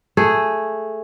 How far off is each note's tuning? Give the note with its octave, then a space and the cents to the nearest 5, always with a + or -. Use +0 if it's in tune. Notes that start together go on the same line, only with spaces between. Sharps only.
A3 +0 G#4 +0